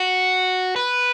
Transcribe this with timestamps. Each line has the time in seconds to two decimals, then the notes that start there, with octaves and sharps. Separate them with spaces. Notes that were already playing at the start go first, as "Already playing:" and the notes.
Already playing: F#4
0.76 B4